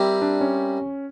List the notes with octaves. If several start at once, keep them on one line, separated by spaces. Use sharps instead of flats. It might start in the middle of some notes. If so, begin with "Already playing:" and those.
Already playing: G3 C4 E4 G4 A#4
D4
C#4